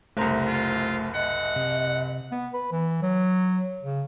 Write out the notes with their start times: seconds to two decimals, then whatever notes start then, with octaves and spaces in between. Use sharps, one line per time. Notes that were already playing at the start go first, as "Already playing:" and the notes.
0.17 F#1 C2 A3 C5 A#5
0.48 F4
1.15 D#5 F#5
1.56 C3
2.31 B3
2.54 B4
2.72 E3
3.02 F#3
3.82 C#3